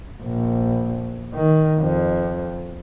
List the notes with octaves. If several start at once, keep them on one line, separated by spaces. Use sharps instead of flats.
A#1
D#3
F2